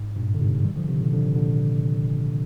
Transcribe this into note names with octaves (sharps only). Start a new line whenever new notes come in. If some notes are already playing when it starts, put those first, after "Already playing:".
Already playing: G#2
G2 A#2
D3
G#2 C3
D#3 G3
D3 F3
C3 D#3
A#2 D3
D3 F3
C3
A#2 D3